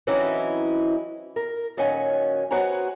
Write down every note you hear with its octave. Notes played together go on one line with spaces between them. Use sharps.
E3 F#3 C4 C#4 D#4 E4
A#4
A#2 D#3 F#3 C#4 G#5
B3 F#4 C5 C#5 G#5 A#5